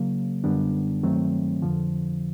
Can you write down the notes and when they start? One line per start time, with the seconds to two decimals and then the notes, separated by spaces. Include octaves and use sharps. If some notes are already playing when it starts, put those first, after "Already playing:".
Already playing: C#3 F#3 A#3
0.44 F#2 D3 G3 B3 D4
1.03 G2 D#3 F#3 A3 C4
1.62 F2 D3 F3